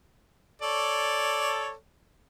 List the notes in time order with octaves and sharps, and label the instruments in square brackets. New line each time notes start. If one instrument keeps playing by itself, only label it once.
[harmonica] A4 C#5 D5